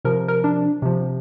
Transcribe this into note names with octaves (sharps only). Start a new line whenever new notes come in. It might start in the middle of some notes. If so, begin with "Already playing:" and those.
C3 F3 A#4
A#4
D4
C3 F3